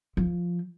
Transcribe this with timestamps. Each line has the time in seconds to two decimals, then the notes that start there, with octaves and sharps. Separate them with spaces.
0.17 F3